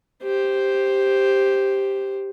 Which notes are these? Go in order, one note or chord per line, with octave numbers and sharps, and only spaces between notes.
G4 C5